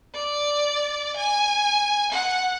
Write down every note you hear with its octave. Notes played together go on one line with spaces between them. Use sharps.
D5
G#5
F#5